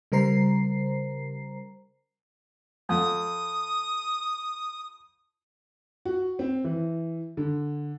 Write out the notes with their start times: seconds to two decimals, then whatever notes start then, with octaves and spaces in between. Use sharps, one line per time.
0.12 C#3 G3 A#4 C5 A#5 C7
2.89 F2 D#6
6.05 F#4
6.39 C4
6.64 E3
7.37 D3